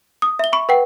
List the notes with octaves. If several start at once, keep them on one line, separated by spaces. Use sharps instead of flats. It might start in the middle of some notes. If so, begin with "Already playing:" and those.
D#6
E5 G7
B5 C#6
B4 F#5 G5